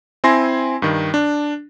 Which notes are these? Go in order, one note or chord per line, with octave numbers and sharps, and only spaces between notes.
C4 E4 G#5 C6 A#6
G2 D#3
D4